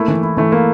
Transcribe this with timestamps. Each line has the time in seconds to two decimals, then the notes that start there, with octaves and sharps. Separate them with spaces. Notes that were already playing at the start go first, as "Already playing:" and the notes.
Already playing: A3 A#3 E4
0.08 E3
0.23 E4
0.37 E3 A3
0.52 A#3 E4